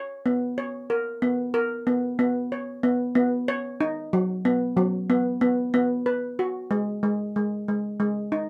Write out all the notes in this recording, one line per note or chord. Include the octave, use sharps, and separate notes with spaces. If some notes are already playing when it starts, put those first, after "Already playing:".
Already playing: C#5
B3
C#5
A#4
B3
A#4
B3
B3
C#5
B3
B3
C#5
D#4
F#3
B3
F#3
B3
B3
B3
B4
F#4
G#3
G#3
G#3
G#3
G#3
D#4